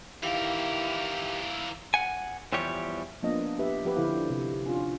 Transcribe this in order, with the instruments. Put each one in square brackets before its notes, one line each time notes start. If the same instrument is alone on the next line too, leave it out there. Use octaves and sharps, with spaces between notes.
[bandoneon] D#3 G4 [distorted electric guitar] E3 A#4 [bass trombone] E4 [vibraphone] F5
[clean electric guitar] F#5 G#5
E2 E3 F3 G3 G4 C#5
[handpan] F3 A#3 B3 D4 F4 D#5
G4 B4 E5
F3 G4 B4
D3 F3 C#4 E4 F5
C3
C#4 D4 F4